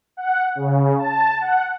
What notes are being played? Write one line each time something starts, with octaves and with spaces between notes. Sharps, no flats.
F#5
C#3
A5
F#5